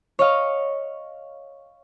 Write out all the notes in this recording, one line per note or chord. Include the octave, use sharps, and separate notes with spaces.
C#5 D#5 F5